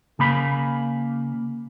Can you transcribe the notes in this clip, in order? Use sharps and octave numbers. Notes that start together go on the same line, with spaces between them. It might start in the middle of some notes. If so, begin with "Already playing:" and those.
C#3 A#3 B5